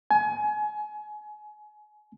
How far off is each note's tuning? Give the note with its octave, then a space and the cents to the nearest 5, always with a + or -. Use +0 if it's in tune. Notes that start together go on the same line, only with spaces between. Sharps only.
G#5 +30